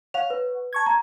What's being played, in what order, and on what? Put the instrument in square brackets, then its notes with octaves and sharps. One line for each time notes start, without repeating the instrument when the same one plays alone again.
[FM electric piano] C#5 F#5 [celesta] F5 F7
[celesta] B4
[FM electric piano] A5 C#6 G#6
[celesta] A#5